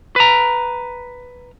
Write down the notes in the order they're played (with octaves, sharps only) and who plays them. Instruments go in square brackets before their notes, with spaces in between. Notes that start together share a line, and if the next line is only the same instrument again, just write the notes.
[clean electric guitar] B4 A#5